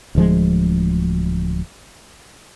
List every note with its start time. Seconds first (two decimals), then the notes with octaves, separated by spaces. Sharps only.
0.15 D1 D2 F3 G#3